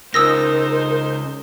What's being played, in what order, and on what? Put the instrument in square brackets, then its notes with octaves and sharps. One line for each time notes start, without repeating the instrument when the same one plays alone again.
[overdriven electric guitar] C#2 [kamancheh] D#4 C5 [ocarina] A#4 [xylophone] D#6 E6 A#6